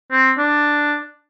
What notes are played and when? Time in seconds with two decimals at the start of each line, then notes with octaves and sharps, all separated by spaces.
0.12 C4
0.38 D4